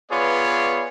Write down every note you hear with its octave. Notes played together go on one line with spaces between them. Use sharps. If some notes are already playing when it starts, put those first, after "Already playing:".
B3 F4 G#4 B4 C#5 D5